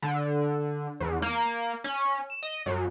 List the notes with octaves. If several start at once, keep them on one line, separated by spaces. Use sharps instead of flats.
D3
E2
A#3
C#4
E7
D#5
F#2